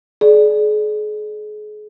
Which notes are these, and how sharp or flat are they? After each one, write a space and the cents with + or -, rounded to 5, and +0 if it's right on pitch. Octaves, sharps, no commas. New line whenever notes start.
G#4 +35 D5 +5